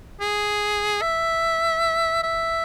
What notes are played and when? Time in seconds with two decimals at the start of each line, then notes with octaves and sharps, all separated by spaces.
0.21 G#4
1.02 E5
2.23 E5